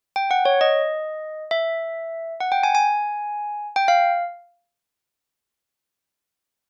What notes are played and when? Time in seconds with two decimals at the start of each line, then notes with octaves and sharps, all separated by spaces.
0.16 G5
0.31 F#5
0.45 C#5
0.61 D#5
1.51 E5
2.40 F#5
2.52 G5
2.63 G#5
2.75 G#5
3.76 G5
3.88 F5